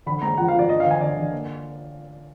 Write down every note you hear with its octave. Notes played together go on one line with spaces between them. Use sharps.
D3 B5
G#3 A#5
F3 F#5
F5
F3
D5
D4 D#5
F5
D3
G#5
D3 D5
D3
A#3